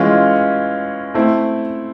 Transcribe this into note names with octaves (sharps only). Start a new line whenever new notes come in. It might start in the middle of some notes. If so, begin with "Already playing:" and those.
Already playing: E3 G#3 C#4 F4
A3 C4 E4